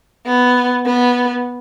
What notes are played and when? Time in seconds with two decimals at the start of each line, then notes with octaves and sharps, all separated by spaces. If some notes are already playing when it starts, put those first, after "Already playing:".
0.26 B3
0.86 B3